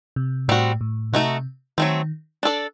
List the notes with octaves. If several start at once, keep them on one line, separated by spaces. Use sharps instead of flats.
C3
A2 G3 C4 F#4
A2
C3 A3 D#4 F#4
D#3 F#3 A3 C4
D4 A4 D5